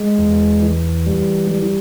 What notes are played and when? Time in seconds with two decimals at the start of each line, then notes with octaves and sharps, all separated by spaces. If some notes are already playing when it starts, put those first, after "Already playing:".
Already playing: G#3
0.18 E2
0.62 E3
1.07 G3
1.51 G3